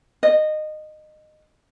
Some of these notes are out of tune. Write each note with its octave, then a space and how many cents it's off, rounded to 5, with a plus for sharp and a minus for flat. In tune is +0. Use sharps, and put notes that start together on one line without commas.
D#5 -20